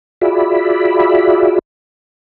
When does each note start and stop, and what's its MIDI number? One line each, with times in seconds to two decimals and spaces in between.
0.21 1.59 65
0.21 1.59 66
0.21 1.59 68
0.21 1.59 74
0.21 1.59 76
0.21 1.59 83